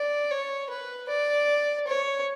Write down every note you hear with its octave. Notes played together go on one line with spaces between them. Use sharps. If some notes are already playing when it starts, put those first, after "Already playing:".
Already playing: D5
C#5
B4
D5
C#5